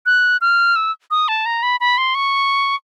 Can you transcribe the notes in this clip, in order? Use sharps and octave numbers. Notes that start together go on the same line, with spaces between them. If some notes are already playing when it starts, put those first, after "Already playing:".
F#6
F6
E6
D#6
A5
A#5
B5
B5
C6
C#6